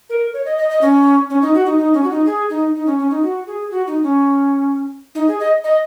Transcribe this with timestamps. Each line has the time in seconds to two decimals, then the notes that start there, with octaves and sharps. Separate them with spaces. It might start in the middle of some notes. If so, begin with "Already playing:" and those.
0.10 A#4
0.34 C#5
0.45 D#5
0.58 D#5
0.70 D#5
0.81 C#4
1.30 C#4
1.42 D#4
1.54 F#4
1.66 D#4
1.78 D#4
1.94 C#4
2.04 F#4
2.10 D#4
2.26 G#4
2.50 D#4
2.75 D#4
2.86 C#4
2.98 C#4
3.10 D#4
3.23 F#4
3.47 G#4
3.71 F#4
3.87 D#4
4.03 C#4
5.15 D#4
5.28 G#4
5.40 D#5
5.64 D#5